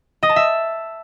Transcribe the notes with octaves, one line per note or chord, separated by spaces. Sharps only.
D#5
A5
E5